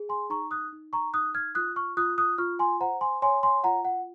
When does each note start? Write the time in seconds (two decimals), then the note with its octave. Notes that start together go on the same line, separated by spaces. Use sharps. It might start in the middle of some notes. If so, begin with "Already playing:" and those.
Already playing: G#4
0.09 G#5 C6
0.30 D#4 A#5 C#6
0.51 D#6 F#6
0.72 D#4
0.93 A#5 C#6
1.14 D#4 D#6 F#6
1.35 F6 G#6
1.55 F4 D#6 F#6
1.76 C#6 F6
1.97 F4 D#6 F#6
2.18 D#6 F#6
2.38 F4 C#6 F6
2.59 G#5 C6
2.81 C5 F#5 A#5
3.01 G#5 C6
3.22 C#5 G#5 C6
3.43 G#5 C6
3.64 F4 F#5 A#5
3.85 F#5